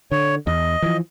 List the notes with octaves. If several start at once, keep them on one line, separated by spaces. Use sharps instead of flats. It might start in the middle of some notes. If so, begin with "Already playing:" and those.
D3 C#5
E2 D#5
E3 F3